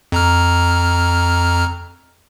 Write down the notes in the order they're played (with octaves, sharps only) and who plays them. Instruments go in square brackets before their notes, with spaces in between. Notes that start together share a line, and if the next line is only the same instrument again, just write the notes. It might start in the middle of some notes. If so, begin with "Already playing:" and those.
[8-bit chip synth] F2 A#5 F6